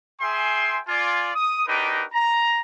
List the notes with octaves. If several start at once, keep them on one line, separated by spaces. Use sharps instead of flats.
G#4 E5 G5 G#5 C6
F4 D5 G#5
D#6
D4 D#4 F#4 G4 A#4 B4
A#5